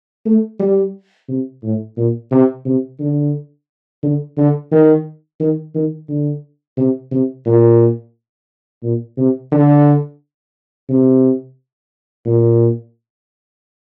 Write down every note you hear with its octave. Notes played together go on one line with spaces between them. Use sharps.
A3
G3
C3
A2
A#2
C3
C3
D3
D3
D3
D#3
D#3
D#3
D3
C3
C3
A#2
A#2
C3
D3
C3
A#2